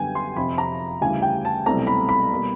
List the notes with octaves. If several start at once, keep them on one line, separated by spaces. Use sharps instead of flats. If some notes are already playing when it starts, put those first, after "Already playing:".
Already playing: F#2 D3 G3 B3 G5 G#5
C6
F2 C3 F3 B5
A#5
D2 C#3 E3 G3 G#5
G5
A5
C2 B2 F#3 A3 C4 A#5
B5
B5
B2 G3 A#3